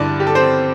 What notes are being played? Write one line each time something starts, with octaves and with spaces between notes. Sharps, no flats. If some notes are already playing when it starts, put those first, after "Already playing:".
Already playing: G2 D3 D4 E4 D5
G4
A4
C4 C5